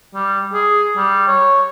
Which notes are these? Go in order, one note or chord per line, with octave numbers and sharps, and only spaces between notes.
G3
G#4
G3
C#5